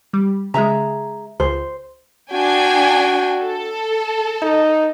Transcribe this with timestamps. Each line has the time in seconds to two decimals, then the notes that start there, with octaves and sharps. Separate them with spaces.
0.13 G3
0.54 C#3 G#3 G#4 E5 A#5
1.40 C#2 C5
2.32 D4 F#4 G5 G#5
3.40 A4
4.42 D#4